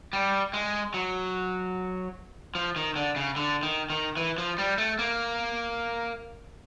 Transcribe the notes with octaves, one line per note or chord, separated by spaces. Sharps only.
G3
G#3
F#3
F3
D#3
D3
C#3
D3
D#3
D#3
E3
F3
G3
A3
A#3